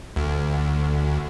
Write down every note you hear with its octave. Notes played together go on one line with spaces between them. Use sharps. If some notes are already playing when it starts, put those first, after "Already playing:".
D2